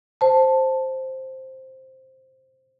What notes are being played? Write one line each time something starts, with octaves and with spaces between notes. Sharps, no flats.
C5 A5